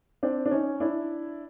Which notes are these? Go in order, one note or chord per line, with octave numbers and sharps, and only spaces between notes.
C4 D4
D4
C#4 D#4
D4 E4